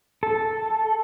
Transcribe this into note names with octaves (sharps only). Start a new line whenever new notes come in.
A4